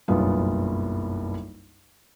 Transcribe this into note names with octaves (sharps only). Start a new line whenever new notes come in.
F#1 B1 G2 B3 F4